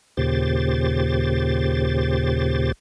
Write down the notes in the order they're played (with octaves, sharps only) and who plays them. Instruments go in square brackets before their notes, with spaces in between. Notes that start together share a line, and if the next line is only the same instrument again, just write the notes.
[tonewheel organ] D#2 A#2 C#3 G4 C5 A6